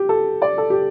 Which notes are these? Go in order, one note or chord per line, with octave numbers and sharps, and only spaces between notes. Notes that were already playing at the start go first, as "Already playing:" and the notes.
Already playing: G4
A4
D5
A4
G4